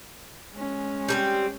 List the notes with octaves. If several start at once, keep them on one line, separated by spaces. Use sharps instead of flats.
G#3 C#4
G3 A#3 C4